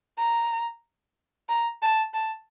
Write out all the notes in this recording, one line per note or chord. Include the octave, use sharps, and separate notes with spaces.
A#5
A#5
A5
A5